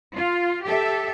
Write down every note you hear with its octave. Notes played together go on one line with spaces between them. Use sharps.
F4
G4 A4 E5